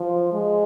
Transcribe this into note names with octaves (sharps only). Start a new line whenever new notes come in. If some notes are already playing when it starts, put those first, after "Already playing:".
Already playing: F3
G#3